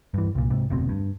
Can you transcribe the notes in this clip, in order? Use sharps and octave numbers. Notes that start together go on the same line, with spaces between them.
G2 E3
C2 A#2
G#2 C3
F1 D2 B2 C4
G2